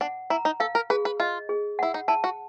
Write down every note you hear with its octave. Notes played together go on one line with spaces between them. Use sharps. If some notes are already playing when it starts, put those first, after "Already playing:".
D4 F#5
E4 A#5
D#4
A4 F5
A#4
G#4 B4
B4
F4 D#5
G#4
E4 F#5
D#4
E4 A5
F#4